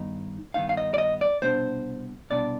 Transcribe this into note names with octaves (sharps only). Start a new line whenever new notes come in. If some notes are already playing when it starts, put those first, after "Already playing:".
Already playing: G2 D#3 B3 D#4
G2 D#3 B3 D#4 F5
F5
D#5
D5
D#5
D5
C2 B2 B3 D4 C5
C2 B2 B3 D4 D5